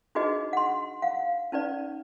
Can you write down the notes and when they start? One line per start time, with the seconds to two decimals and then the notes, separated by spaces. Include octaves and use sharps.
0.15 D4 D#4 F#4 G#4 B4 D#5
0.53 F#5 C6
1.02 F5 F#5
1.52 C#4 D#4 B4 D5